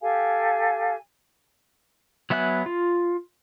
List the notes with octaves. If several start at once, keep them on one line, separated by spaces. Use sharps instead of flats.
G4 A4 F5 G#5
F#3 B3 E5 G#5 F#6
F4